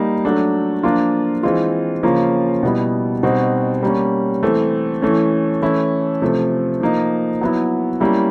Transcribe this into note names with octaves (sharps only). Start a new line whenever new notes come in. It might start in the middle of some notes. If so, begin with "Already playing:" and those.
Already playing: G3 A#3 D#4
F#3 A3 D4
F3 A#3 D4 F4
E3 G#3 C4 F4
C#3 F3 A#3 C#4 F4
B2 G3 B3 E4
B2 G3 C4 D#4 F#4
G3 A#3 C#4
E3 A3 C4
E3 A3 C#4
E3 A3 C#4 E4
C3 F3 A3
F3 A#3 D#4
F#3 B3 E4
G3 A#3 C#4 E4